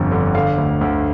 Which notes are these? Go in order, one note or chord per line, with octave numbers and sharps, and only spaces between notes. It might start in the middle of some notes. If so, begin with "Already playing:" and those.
Already playing: G1 F2 D3
D3
D3 F5
D2
D2